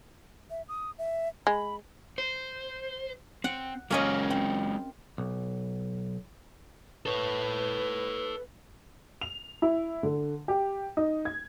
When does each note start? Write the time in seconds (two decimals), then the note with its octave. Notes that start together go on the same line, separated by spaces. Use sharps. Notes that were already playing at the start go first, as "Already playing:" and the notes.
0.50 E5
0.68 D#6
0.98 E5
1.47 G#3 B5
2.18 C5
3.44 C4 F#5
3.90 F#3 G#3 A#3 C#4 C#5 D#5
4.30 C4
5.18 B1
7.06 A4 B4 C#5
9.21 F7
9.62 E4
10.03 D3
10.48 G4
10.97 D#4
11.25 G#6